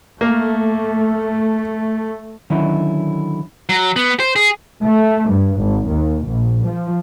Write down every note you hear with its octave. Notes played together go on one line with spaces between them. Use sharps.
A3 A#3
D3 D#3 F#3 C#4 D#4 E4
F#3
B3
C5
G#4
A3
G2
G#1
D#2
A#1
F3